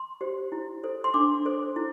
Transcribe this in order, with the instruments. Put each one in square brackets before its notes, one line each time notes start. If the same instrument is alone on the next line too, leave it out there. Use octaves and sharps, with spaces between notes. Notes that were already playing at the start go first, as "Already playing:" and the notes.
Already playing: [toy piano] C6
G4 C5
E4
A4 C5
C6
D4 D6
A4 C5
E4